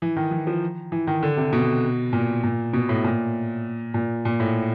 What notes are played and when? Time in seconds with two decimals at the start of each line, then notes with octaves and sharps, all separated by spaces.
0.02 E3
0.17 D#3
0.31 E3
0.47 F3
0.92 E3
1.07 D#3
1.23 D3
1.37 C3
1.53 B2
2.13 A#2
2.43 A#2
2.73 B2
2.89 A2
3.04 A#2
3.94 A#2
4.25 A#2
4.40 A2